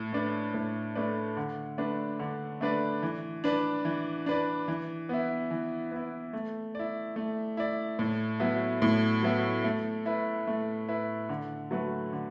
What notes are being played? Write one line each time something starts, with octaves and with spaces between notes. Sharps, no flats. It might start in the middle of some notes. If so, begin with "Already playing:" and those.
Already playing: A2
A3 D4 B4 D5
A2
A3 D4 B4 D5
D3
A3 D4 B4 D5
D3
A3 D4 B4 D5
E3
D4 B4 D5
E3
D4 B4 D5
E3
B3 E4
E3
B3 E4
A3
E4 D5
A3
E4 D5
A2
F#3 B3 E4
A2
F#3 B3 E4
A3
E4 B4
A3
E4 B4
D3
F#3 A3 F#4 B4
D3